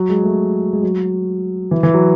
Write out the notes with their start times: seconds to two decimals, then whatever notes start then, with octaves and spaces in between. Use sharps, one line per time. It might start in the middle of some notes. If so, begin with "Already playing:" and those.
Already playing: F#3
0.09 G#3
0.24 A3
0.73 G#3
0.83 F#3
1.71 E3
1.83 E3
1.94 F#3